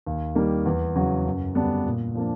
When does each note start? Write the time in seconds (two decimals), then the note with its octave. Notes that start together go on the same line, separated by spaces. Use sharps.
0.06 D#2
0.35 D#3 G3 A#3
0.65 E2
0.95 C#3 F#3
1.26 F#2
1.55 D3 G3 B3 D4
1.86 A#2
2.15 F3 A#3 D4